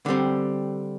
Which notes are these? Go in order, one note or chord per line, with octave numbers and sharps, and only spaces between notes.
D3 G3 C4